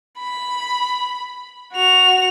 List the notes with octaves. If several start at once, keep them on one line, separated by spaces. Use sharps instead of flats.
B5
F#4 F7